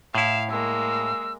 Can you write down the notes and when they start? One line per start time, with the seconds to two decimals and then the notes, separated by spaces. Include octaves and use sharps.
0.15 A2 E4 F5 E7
0.50 G#3 A#3 E6